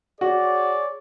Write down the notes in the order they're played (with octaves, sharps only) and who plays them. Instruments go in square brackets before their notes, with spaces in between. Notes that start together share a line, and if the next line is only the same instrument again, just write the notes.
[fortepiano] F#4 [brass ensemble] G#4 C#5 D5